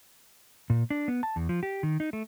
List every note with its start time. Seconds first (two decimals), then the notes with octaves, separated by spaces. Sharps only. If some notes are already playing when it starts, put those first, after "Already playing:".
0.70 A#2
0.90 D4
1.08 B3
1.23 A5
1.36 E2
1.49 F3
1.63 G4
1.83 D#3
2.00 D#4
2.13 A3